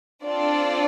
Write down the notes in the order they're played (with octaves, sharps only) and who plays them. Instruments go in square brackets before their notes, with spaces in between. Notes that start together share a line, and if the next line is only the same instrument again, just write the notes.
[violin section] C4 D4 F4 A4 D5